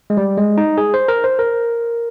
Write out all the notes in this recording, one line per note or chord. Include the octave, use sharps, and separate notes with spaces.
G#3
G3
G#3
D#4
G#4
C5
A#4
C5
A#4